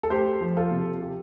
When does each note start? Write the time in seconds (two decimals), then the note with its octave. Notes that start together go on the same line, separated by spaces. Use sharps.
0.03 A4
0.10 A3 G4 C5
0.41 F3
0.57 F4 A4
0.71 C3
1.02 G4